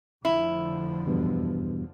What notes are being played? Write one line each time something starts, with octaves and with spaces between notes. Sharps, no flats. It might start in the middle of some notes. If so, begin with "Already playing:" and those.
F1 D3 F3 E4
E2 G2 B2